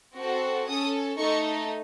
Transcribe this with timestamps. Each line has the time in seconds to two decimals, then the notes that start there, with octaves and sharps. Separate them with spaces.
0.18 C4 F#4 A4
0.69 C#4 A4 D#6
1.19 A3 D#4 A4 C#6